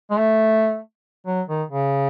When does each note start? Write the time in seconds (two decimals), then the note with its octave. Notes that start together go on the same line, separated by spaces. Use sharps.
0.11 G#3
0.19 A3
1.26 F#3
1.48 D#3
1.69 C#3